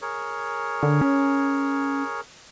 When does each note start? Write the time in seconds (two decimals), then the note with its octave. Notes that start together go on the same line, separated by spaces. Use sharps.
0.02 G#4 A#4 C#5
0.83 D3
1.01 C#4